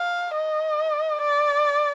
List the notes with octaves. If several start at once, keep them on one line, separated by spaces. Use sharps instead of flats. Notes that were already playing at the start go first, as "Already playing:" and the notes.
Already playing: F5
D#5
D5